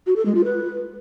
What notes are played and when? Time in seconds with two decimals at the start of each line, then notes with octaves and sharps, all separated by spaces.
0.07 F#4
0.16 A4
0.25 G#3
0.35 F4
0.44 B4